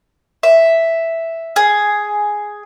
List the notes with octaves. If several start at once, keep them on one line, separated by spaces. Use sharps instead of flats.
E5
G#4